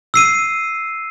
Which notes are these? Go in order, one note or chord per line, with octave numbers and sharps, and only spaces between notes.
E6 C7 D#7